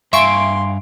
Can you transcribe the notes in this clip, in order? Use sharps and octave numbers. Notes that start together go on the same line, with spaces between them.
G2 E5 F5 G#5 C6 C#6 D7